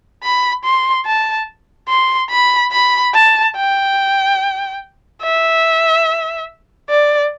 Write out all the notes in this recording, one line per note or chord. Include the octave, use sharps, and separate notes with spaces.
B5
C6
A5
C6
B5
B5
A5
G5
E5
D5